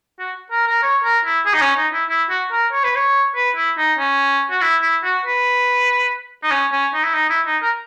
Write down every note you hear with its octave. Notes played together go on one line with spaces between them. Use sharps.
F#4
A#4
A#4
C#5
A#4
E4
G#4
D#4
C#4
D#4
E4
E4
F#4
A#4
C#5
B4
C#5
B4
E4
D#4
C#4
F#4
E4
E4
F#4
B4
D#4
C#4
C#4
D#4
E4
D#4
E4
D#4
A#4